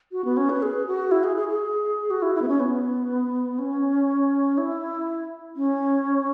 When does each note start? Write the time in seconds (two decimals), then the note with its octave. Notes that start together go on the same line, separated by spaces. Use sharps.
0.12 F#4
0.25 B3
0.37 C#4
0.49 B4
0.62 G#4
0.87 F#4
1.11 E4
1.24 G#4
1.36 G#4
1.48 G#4
2.10 F#4
2.22 E4
2.35 E4
2.42 B3
2.48 C#4
2.60 B3
3.59 C#4
4.58 E4
5.56 C#4